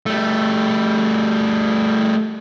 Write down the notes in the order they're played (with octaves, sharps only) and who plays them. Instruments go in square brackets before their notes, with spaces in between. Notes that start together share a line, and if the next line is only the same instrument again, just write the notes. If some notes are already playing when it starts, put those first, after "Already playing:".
[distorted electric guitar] G3 A3